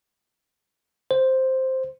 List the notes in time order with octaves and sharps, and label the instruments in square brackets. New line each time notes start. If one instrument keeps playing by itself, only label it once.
[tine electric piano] C5